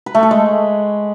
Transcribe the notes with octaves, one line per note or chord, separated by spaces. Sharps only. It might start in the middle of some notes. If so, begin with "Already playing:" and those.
B4
A3
A4
G#3